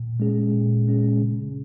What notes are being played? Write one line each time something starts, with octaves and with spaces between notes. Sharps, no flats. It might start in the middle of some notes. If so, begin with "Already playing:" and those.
Already playing: A#2
G#3 C#4 G#4
A#2
G#3 C#4 G#4
C#3